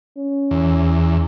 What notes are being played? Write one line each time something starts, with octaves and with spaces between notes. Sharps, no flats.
C#4
E2